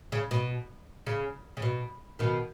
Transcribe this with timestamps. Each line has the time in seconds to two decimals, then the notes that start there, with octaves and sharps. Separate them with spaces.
0.12 C#3
0.31 B2
1.07 C#3
1.57 C#3
1.62 B2
2.19 B2 D#3